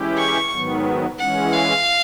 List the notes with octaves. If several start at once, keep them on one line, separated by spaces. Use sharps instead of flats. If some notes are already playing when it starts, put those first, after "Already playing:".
Already playing: E3 G#3 C#4 E4 G4
C#6
G#2 D#3 F#3 B3
E3 G#3 C#4 F#5
F5